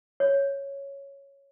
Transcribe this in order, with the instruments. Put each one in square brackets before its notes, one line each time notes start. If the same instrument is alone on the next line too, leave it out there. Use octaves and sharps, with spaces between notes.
[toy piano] C#5